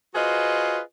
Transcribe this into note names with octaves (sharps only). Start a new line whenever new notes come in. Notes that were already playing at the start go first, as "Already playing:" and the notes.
F4 F#4 G#4 B4 C5 D#5